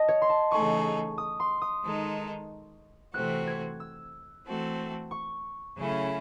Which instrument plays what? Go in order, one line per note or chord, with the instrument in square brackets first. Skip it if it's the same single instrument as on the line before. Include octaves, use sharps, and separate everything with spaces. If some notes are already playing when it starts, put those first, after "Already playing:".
Already playing: [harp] D#5 A5
C#5
C6
A5
[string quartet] C#3 E3 A3 D#4 G#4 [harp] C#6
[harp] D#6
C6
D#6
[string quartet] D#3 G#3 D#4 A4
[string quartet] C3 E3 A3 C4 F#4 [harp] F#6
[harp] G#6
E6
[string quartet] E3 A3 C4 F#4 A4
[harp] C#6
[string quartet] C#3 F#3 A3 C#4 E4